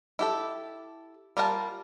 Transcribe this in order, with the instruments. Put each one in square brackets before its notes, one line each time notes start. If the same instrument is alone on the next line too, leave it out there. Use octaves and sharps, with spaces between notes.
[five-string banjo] E4 G4 A4
G3 F4 A#4 F#5 A5